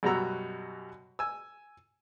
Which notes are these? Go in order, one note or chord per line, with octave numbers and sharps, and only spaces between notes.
F#2 B2 G3 F#4 A#5 E6
G#5 E6